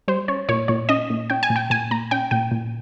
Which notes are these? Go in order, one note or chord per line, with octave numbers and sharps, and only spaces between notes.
G3 C5
C#4 C#5
A#2 C#5
A#2 C#5
C#4 D#5
A#2
C#4 G5
G#5
A#2
G5
A#2 G#5
A#2 A#5
C#4 G5
A#2 G5
A#2